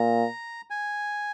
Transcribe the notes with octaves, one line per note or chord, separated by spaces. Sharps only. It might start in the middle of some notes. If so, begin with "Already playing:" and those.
Already playing: A#2 A#5
G#5